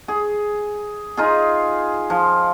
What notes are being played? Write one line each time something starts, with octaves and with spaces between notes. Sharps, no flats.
G#4
D#4 F4 G#4
F3